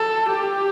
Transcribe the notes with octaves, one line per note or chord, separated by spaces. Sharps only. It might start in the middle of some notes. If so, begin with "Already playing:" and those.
Already playing: A4
G4